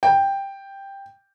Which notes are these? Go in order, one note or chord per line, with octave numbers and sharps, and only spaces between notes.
G5